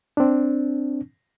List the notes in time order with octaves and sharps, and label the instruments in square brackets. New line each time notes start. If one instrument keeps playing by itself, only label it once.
[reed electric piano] C4 D4